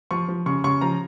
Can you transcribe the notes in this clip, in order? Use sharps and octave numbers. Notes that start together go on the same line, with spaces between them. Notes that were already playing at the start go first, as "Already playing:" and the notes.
F3 C#6
F3
C#3 C#6
C#3 C#6
F3 A#5